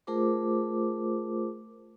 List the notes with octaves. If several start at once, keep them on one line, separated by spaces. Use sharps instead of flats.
A3 F4 G#4 A#4 C5 D6